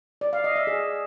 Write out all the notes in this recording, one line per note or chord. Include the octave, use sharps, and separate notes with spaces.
D5
F5
D#5
E5
G#4